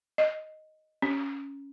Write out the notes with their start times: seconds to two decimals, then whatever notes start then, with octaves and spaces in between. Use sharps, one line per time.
0.18 D#5
1.02 C#4